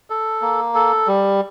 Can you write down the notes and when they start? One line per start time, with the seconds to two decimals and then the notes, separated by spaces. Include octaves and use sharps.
0.10 A4
0.42 A#3
0.75 A4
1.07 G3